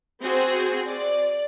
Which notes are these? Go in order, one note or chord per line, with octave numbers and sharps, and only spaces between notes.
C4 F#4 G#4 C5
D5